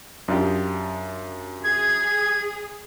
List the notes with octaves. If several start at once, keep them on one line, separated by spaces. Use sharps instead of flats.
F#2 D4 F4 G4
G#4 G#6